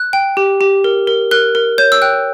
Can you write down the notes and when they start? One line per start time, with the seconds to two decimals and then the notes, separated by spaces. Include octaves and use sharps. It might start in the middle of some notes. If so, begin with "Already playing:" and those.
Already playing: F#6
0.13 G5
0.37 G4
0.61 G4
0.84 A#4
1.07 A#4
1.31 A#4 F#6
1.55 A#4
1.78 C#5 G6
1.92 E6
2.02 G5 F#6